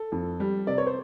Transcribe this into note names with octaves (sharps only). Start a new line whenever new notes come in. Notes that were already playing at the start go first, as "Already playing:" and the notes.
Already playing: A4
F2
G3
C3 D5
C#5
C5